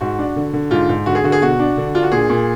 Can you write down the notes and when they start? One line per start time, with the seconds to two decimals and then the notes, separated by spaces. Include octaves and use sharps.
0.01 G#2 F#4
0.19 D4
0.36 D3
0.53 D3
0.71 G#2 F4
0.89 G#2
1.06 D3 F#4
1.15 G#4
1.24 D3 F#4
1.32 G#4
1.41 B2 F#4
1.59 D4
1.77 D3
1.95 D4 F4
2.03 F#4
2.12 A#2 G#4
2.30 A#2